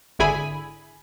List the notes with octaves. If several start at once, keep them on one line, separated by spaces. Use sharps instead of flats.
G#1 D3 E4 G#4 G#5 B5